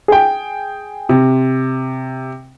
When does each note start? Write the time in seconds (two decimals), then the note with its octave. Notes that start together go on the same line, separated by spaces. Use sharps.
0.08 G#4 G5
1.09 C3